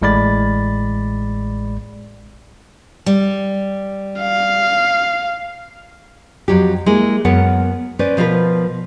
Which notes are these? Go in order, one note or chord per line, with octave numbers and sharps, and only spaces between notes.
A1 A2 G#3 D5 B5 A6
G3
F5
F2 F#3 G4
G#3 A#3 E4
F#2 B3 A#4 C#5 F#5
C#4 B4 C5 D5
B2 F3 F4 G4 A#4 B4